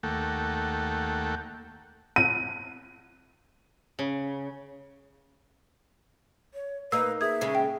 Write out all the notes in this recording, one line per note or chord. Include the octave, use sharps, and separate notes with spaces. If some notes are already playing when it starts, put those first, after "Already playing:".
D#2 A3 A#3 A4 F#5 G5
D#7
C#3
C#5
A#3 D#4 B4 E6
G#4 E5 D#6 G#6
C#3 G#3
G5